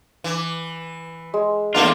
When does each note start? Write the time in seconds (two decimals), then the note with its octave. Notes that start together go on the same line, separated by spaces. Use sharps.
0.24 E3
1.34 G#3
1.75 E2 A3 A#3 D4 F4